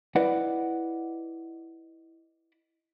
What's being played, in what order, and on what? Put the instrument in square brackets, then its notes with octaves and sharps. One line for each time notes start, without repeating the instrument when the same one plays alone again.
[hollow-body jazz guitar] E4 B4 D5 D#5 F#5